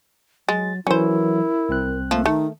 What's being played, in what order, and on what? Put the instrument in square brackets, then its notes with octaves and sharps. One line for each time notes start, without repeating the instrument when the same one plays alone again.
[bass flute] F#3 [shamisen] G#3 [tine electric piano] A6
[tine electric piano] E3 F#3 [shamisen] C#4 C5 [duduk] E4 [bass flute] A#4
[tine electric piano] C2 C4 F#6
[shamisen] F3 [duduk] A3 [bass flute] A#3
[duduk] D#3 [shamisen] A3 [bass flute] D#4